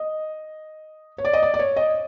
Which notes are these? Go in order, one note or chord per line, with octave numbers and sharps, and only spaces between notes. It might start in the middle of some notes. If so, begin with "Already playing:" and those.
Already playing: D#5
C#5
D5
D#5
D5
D5
C#5
D#5